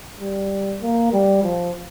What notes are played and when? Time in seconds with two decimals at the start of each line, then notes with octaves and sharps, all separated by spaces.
0.20 G3
0.82 A#3
1.13 G3
1.43 F3